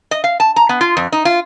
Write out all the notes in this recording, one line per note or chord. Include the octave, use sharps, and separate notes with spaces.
D#5
F5
A5
A#5
B3
F4
F2
D#4
F4